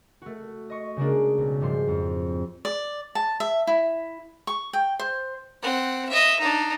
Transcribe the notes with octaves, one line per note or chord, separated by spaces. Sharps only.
A3 F#4
D#5 C#6
C#3 G#3 A#3 D4
B1
G#2 F3 G3 C6
F2
D5
A5
E5
E4
C#6
G5
C5
C4 F#5
D#5 E5
D4 D#4